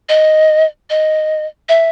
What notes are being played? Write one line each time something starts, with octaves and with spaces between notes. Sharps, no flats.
D#5
D#5
E5